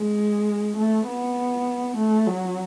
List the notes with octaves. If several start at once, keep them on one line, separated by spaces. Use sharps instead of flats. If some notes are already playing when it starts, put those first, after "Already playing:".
Already playing: G#3
A3
B3
A3
F#3